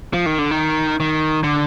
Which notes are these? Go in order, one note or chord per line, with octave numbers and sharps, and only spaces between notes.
F3
D#3
D3
D#3
D#3
D3